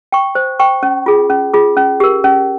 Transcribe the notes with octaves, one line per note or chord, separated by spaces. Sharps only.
G5 C#6
C5
G5 C#6
C#4
F4 G#4
C#4
F4 G#4
C#4
G4 A#4
C#4